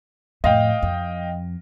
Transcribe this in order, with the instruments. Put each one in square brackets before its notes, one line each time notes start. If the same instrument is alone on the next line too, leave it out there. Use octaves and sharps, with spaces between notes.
[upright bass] F2 A2 [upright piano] D#5 F5 G5
[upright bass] F2